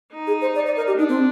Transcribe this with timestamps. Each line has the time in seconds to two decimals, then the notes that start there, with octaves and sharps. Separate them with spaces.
0.13 D#4
0.27 G#4
0.42 C5
0.55 D5
0.66 D5
0.76 A#4
0.87 G4
0.98 D4 D#4
1.09 C4